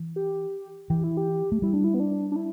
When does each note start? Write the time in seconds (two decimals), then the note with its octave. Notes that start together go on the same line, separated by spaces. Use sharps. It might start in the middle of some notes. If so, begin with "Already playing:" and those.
Already playing: E3
0.16 G4
0.90 E3 G4
1.04 E4
1.17 G4
1.52 A3
1.62 G3 E4
1.74 D4
1.84 E4
1.94 B3
2.00 D4
2.32 D4
2.36 E4